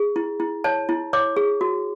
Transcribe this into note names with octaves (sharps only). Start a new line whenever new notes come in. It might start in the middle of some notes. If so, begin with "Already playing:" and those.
Already playing: G#4
E4
E4
C#5 A5
E4
C#5 D6
G#4
F#4